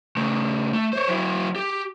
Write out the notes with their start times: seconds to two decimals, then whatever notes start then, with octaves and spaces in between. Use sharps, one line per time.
0.17 C#3 A3
0.73 A3
0.93 C5 C#5
1.09 F#3 E4
1.56 G4